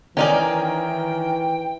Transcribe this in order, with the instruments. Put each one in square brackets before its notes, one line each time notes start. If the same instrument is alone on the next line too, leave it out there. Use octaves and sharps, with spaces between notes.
[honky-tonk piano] D#3 A#4 G#5 [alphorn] E3 [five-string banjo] C#4 D#4 D5 [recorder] G5